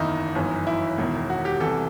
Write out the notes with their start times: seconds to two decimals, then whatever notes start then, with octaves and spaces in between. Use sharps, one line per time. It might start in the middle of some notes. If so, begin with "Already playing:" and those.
Already playing: F#1 E2 D#3 D#4 E4
0.35 G1 F#2 E3
0.67 E4
0.98 E1 E2 D#3
1.30 F#4
1.45 G4
1.60 C2 C3 E3 A4